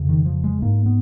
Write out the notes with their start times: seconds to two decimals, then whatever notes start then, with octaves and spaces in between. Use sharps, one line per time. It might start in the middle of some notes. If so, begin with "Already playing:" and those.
Already playing: F2 C#3
0.09 D#3
0.26 F3
0.44 G#3
0.62 G#2 A#3
0.86 B3